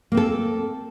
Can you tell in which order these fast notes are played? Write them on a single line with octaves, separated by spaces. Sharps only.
A#3 C4 A4